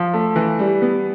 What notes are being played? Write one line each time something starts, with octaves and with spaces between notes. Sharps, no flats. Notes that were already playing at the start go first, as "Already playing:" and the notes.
Already playing: F3
A3
E3
G3
B3